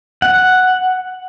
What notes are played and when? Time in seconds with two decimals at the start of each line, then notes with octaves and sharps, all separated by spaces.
0.22 F#5